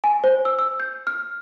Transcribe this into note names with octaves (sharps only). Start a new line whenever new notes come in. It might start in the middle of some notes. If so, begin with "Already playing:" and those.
G#5
C5
E6
E6
G6
F6